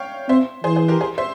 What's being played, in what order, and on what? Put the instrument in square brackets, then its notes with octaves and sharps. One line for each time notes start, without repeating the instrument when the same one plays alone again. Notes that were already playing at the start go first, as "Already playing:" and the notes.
Already playing: [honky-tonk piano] C#5 F5 G5
[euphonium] C4 [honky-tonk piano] C5 E5
[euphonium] E3 [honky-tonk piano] G#4 C5
[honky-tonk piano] G#4 C5
G4 A#4
G#4 C5
C5 E5